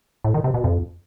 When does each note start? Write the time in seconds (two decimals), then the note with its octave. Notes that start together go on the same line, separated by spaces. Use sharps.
0.24 A2
0.34 D#3
0.44 C3
0.54 B2
0.64 F2